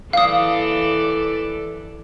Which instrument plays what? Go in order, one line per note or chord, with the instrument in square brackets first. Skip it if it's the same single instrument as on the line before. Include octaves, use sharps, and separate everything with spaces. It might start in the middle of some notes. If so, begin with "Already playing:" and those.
[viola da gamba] E3 A4 D5 [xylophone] F5 D#6